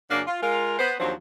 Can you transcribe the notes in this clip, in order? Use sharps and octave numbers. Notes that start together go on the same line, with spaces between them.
F#2 C#3 F#3 A#3 D4
F4
G#3 F4 A#4
B3 C5
D#2 F3 F#3 C4 D4 C5